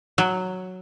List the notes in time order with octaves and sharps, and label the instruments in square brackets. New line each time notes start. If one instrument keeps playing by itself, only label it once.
[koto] F#3